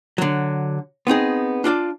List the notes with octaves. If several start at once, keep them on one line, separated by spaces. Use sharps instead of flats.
D3 F#3
B3 C4 D#4 G#4
D4 F4 D5 A5